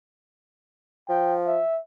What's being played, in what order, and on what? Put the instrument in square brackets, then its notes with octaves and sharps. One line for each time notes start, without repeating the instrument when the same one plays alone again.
[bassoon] F3 [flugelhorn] G5
[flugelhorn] E5